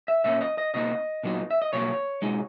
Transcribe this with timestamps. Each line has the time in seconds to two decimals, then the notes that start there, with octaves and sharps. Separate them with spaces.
0.08 E5
0.24 A#2 A#3 C#4 E5
0.41 D#5
0.58 D#5
0.74 B2 A#3 D#4 D#5
1.23 A#2 F#3 B3 D#4
1.51 E5
1.62 D#5
1.73 B1 B2 A#3 C#5
2.22 B2 G#3 D#4